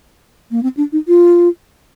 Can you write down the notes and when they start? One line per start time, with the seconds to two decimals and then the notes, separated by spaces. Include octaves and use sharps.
0.51 A#3
0.63 C4
0.77 D4
0.92 D#4
1.08 F4